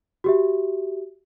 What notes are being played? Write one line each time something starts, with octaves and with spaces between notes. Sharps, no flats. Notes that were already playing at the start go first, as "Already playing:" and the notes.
F#4 G4 E5